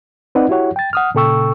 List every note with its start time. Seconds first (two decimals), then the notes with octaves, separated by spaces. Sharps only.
0.35 C4 D#4 B4 D5 F#5
0.49 E4 F#4 G4 C#5 F#5
0.76 G5 A6
0.93 F#5 D#6 F6
1.15 A#2 C#3 A4 G5 C#6 E6